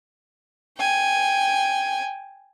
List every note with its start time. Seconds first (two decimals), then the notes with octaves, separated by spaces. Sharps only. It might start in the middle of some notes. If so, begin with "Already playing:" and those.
0.77 G5 G#5